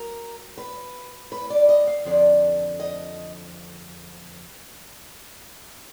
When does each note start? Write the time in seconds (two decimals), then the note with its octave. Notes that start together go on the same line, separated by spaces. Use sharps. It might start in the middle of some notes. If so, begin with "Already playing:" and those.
Already playing: F#3 A#4
0.58 B4
1.32 B4
1.50 D5
1.69 D#5
1.87 F5
2.05 F2 D3 F3 D5
2.80 D#5